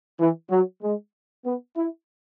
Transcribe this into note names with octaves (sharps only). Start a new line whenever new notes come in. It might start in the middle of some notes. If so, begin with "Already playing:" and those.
E3
F#3
G#3
B3
E4